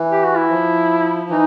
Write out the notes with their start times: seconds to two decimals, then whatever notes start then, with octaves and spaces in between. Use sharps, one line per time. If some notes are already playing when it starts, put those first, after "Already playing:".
Already playing: E3
0.11 G4
0.24 F#4
0.37 E4
0.50 F3
1.29 E3 D#4